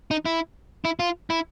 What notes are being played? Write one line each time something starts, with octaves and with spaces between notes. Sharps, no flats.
D#4
E4
E4
F4
E4